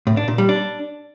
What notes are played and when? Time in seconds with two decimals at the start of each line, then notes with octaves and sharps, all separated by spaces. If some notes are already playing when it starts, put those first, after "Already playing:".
0.07 A2
0.17 D4
0.28 A#2
0.38 G3
0.49 D4